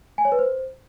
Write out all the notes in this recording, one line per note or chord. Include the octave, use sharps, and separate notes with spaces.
G#5
C#5
B4
C5